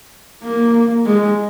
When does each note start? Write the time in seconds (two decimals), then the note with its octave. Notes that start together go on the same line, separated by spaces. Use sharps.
0.43 A#3
1.06 G#3